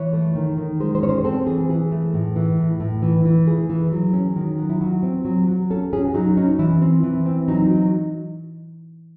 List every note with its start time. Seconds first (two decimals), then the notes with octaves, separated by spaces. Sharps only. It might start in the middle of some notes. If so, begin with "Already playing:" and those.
Already playing: E3 C#5
0.13 A3
0.35 D#3
0.57 D#3
0.80 G#3 C5
0.95 C5
1.02 C#4 C#5
1.09 C5
1.24 C4 A4
1.46 E3 G#4
1.69 E3 G#4
1.92 A3
2.14 A2
2.36 E3
2.58 A2
2.80 A2
3.02 E3
3.25 E3
3.47 A3 G#4
3.69 E3
3.92 F#3
4.13 C#4
4.36 D#3
4.58 F#3
4.69 E4
4.81 F#3 F#4
5.03 C4
5.25 F#3
5.47 F#3
5.70 C#4 A4
5.93 C#4 G#4
6.04 F#4
6.14 F#3 D#4
6.37 C#4 D#4
6.59 E3 E4
6.81 C4
7.03 E3
7.26 C4
7.48 F#3 D#4
7.71 F#3